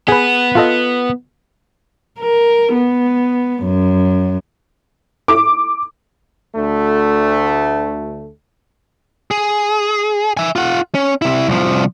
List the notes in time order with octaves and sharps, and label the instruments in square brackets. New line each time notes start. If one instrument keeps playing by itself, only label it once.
[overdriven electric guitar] B3 [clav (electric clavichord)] G#4 B4
[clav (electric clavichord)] F4 A4 D#5
[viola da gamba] A#4
B3
F#2
[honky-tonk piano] D6
[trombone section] D2 A3
[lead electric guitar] G#4
E5 G#5
F4 F#5
C#4
C3 E4
C2 F3